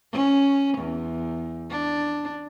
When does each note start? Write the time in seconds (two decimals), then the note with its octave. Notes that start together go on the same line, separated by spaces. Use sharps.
0.12 C#4
0.77 E2
1.70 D4